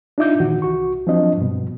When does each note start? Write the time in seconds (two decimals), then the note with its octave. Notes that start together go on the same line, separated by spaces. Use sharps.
0.18 D4 D#4 F4 E5 D6 G6
0.40 A#2 D#3 E3 F#4
0.62 C2 F#4 C#6
1.07 F3 F#3 C4 D4 D#5
1.37 G2 B2